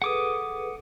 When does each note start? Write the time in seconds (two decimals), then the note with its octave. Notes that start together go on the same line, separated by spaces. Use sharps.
0.02 G#4 A4 B4 F#5 D6 D#6